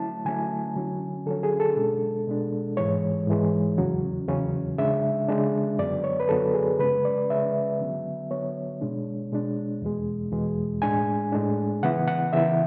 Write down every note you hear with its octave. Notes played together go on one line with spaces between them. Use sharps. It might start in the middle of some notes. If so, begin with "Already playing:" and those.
Already playing: D3 F#3 A3 C#4 E4 A5
D3 F#3 A3 C#4 E4 G#5
D3 F#3 C#4
D3 F#3 C#4 A4
G#4
A4
B2 G#3 D4
B2 G#3 D4
G#2 E3 G#3 C#5
G#2 E3 G#3
E2 C#3 F#3 C#4
E2 C#3 F#3 C#4
C#3 G#3 D4 E5
C#3 G#3 D4
F#2 D3 F#3 B3 D5
C#5
B4
F#2 D3 F#3 B3 A4
G#4
C#3 G#3 C#4 B4
D5
C#3 G#3 C#4 E5
D3 F#3 B3
D3 F#3 B3 C#5
B2 G#3 D4
B2 G#3 D4
E2 B2 G#3
E2 B2 G#3
A2 G#3 D4 G#5
A2 G#3 D4
C#3 E3 B3 E4 F#5
F#5
C#3 E3 B3 E4 E5